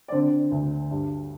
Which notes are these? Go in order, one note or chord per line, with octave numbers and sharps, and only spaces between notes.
D5
D3 C4 C5
D2
G2